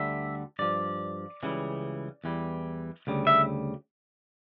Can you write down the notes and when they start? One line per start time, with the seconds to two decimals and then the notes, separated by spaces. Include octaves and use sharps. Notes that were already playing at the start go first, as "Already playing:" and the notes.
Already playing: D2 D3 G3 E5
0.59 G2 F3 D5
1.43 C#2 C#3 E3 G3
2.24 E2 E3 G3
3.07 D2 C#3 G3
3.27 E5